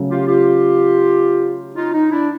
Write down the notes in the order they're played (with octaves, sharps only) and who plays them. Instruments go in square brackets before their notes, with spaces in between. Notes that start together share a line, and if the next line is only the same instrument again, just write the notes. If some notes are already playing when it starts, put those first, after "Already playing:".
Already playing: [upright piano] C#3 F#3 A3
[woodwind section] F4 G4
F4 G4
D#4 F4
D#4
D4 E4